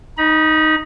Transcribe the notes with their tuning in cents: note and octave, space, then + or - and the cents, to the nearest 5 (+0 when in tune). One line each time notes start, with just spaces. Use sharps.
D#4 +0 B5 -40